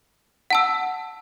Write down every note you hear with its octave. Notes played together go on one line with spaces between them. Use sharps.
F#5 A5 E6